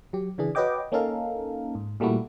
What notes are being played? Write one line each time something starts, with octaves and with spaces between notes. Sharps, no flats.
F#3 G4
C#3 E3 D4 G#4
F#4 B4 C#5 D#5 G5 D6
A#3 C#4 D#4 A4 A#4 F5
G#2
A#2 G3 A3 A#3 E4 F#4